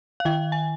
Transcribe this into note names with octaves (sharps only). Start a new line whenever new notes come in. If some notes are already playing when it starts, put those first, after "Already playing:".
F5
D#3 G5
G#5